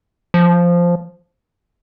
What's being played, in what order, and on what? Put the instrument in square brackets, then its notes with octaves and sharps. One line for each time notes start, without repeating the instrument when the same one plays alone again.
[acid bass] F3